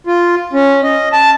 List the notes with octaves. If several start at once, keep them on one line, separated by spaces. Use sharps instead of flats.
F4
C#4
D#5
A5